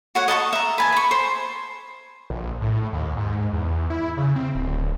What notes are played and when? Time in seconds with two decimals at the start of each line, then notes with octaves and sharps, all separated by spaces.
0.15 F#4 C#5 F#5
0.28 D#5 A5 A#5 C#6
0.53 E5 A#5
0.78 B4 G#5 A5
0.92 B5 C#6
1.11 C5
2.30 A#1
2.61 A2
2.93 D#2
3.17 G#2
3.53 E2
3.90 E4
4.17 C#3
4.36 C4
4.55 D1